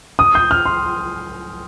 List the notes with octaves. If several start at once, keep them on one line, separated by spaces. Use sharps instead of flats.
D#6
G6
F6
C6